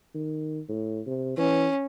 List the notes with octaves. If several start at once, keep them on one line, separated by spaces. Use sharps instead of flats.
D#3
A2
C3
E3 C#4